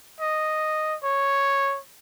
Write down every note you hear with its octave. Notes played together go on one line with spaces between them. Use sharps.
D#5
C#5